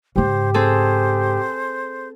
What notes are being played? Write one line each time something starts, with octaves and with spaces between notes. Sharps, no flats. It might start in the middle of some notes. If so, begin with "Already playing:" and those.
G#2 C#3 G4 C5
C4 G#4 A4 C5